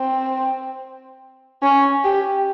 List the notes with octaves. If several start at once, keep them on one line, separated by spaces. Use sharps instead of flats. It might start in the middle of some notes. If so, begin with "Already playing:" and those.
Already playing: C4
C#4
G4